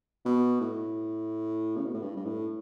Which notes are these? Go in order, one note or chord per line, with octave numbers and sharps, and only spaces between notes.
B2
A2
C#3
B2
A2
G2
G2
A2